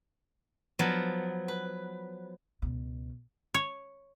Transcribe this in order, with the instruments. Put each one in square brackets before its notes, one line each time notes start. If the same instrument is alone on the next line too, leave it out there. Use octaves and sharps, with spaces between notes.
[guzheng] F3 F#3 B3
B4
[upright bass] C#2 B2
[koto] C#5